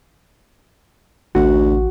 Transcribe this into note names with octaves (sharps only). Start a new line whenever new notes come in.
A1 D2 F#4